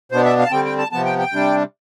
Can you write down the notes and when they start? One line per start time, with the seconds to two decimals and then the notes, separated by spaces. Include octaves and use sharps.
0.12 B2 B3 D4 C5
0.25 E5
0.38 F5
0.46 A5
0.51 D3 G3 C4 G5
0.65 G5
0.78 A5
0.92 C3 F3 B3 A5
1.05 G5
1.19 G5
1.32 C3 G3 D4